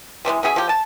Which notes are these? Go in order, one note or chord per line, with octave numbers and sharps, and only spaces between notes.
C3 E3 F#3 G#3
B2 C#4 G#4 E5
F3 G4
A5